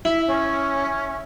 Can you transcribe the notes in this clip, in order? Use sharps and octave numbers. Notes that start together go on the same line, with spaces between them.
E4 E5
C#4